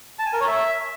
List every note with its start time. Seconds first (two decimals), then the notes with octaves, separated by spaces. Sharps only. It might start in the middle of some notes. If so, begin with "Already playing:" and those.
0.19 A5
0.26 G#5
0.33 A#4
0.40 C#5
0.47 E5